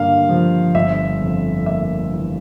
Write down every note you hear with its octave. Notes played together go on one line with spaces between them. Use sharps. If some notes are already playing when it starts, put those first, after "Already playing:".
Already playing: G2 D3 A#3 F5
F3
G1 E5
F2
A#3 E5
E3